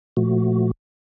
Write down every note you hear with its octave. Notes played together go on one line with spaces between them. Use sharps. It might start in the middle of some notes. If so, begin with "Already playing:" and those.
A#2 F3 A3 F#4